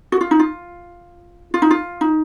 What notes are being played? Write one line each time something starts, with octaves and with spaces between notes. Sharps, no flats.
F#4
F4
D#4
F4
F4
D#4
F4
D#4